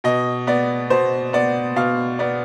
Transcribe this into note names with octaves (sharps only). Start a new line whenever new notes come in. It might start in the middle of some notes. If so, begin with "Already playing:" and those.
B2 D#5
B3 D5
B2 C5
B3 D5
B2 F5
B3 D5